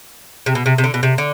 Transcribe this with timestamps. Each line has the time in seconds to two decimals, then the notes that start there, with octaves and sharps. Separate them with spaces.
0.46 C3
0.55 B2
0.66 C3
0.78 C3
0.84 D3
0.94 B2
1.03 C3
1.18 D3